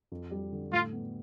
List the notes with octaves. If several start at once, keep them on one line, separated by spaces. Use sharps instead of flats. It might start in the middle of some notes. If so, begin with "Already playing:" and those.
F2
G3
D3
A2 F4
B3